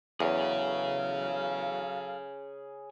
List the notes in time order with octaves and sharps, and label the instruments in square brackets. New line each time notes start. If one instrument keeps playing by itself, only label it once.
[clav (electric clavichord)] E2 [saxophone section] F#3 A4 F5 [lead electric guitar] G#4 C#5